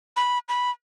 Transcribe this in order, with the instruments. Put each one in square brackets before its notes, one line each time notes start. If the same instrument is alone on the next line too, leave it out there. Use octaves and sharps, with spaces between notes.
[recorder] B5
B5